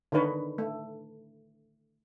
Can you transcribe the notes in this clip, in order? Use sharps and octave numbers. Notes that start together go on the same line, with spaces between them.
D3 D#3 D#4 B4 C#5
A3